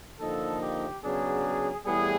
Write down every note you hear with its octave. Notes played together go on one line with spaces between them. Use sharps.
D3 F3 A#3 D#4 A4
G4
C#3 F#3 B3 D4 G#4
A2 E3 G3 B3 G#4